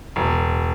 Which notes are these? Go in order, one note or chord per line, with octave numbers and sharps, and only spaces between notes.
E1